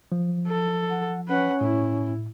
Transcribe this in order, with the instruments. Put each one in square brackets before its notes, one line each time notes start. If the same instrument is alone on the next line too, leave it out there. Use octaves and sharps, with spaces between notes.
[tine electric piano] F3
[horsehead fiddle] A4
[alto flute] F#5
[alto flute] C#4 [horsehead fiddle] B4 F#5
[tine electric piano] A2 [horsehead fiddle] E4